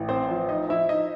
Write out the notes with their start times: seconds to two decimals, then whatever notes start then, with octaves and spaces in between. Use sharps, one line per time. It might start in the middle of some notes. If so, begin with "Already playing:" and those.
Already playing: A1
0.09 C4 C5
0.29 F3
0.49 D#4 D#5
0.69 F3 E4 E5
0.89 D#4 D#5